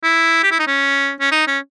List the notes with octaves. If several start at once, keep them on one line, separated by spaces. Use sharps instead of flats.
E4
G4
E4
D#4
C#4
C#4
D#4
C#4